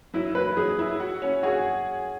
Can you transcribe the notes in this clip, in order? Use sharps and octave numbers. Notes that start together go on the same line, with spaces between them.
F#3 E4
F#3 B4
F#3 G#4
E4
F#4
C#4
F#4 G#4